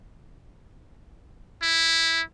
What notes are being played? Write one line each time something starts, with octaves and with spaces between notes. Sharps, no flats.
E4